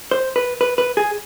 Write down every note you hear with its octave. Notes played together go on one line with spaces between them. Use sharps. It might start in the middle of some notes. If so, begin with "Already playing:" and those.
C5
B4
B4
B4
G#4